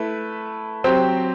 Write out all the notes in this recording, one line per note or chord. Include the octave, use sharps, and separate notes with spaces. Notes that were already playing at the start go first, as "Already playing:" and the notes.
Already playing: A3 E4 B4
F#3 C4 G4 C5